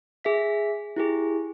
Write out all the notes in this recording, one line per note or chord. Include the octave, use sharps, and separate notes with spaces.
G#4 E5 B6
E4 G4 G#4